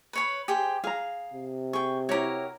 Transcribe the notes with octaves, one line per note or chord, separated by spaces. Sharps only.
B4 C#5 B5
G4 G#4 C5
G#4 F5 A#5
C3
G#4 G5 C#6
E4 F#4 G4 A#4 C#5